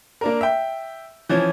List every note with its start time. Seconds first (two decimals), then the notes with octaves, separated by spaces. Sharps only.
0.21 A#3 D4 A#4
0.41 E5 G5
1.29 E3 F3 C#4